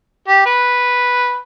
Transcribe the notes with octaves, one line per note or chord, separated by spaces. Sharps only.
G4
B4